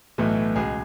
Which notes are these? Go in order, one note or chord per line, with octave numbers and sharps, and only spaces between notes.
B1 A2 E3 A3
C#2 B2 G#3 G#4